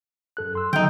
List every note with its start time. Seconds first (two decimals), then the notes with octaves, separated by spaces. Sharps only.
0.37 F#2 A4 F#6
0.55 C6 E6
0.73 D3 D#3 F#3 D#4 G5